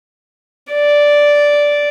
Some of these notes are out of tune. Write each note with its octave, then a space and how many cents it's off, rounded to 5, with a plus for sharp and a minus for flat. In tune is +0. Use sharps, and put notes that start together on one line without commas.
D5 -5